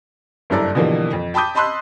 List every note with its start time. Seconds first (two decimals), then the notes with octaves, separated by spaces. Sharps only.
0.50 F#1 G2 E4 A4 D5 A#5
0.75 B2 D3 E3 F3 G3 A#3
1.13 F2
1.34 G5 A5 B5 D6 D#6 G6
1.55 D#5 A5 B5 C6 E6 F#6